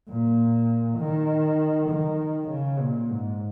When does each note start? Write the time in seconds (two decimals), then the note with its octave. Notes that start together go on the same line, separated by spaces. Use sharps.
0.09 A#2
0.99 D#3
1.89 D#3
2.49 C#3
2.80 A#2
3.10 G#2